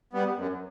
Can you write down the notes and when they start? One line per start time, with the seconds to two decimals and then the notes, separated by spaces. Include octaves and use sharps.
0.13 G3 B3
0.37 F#2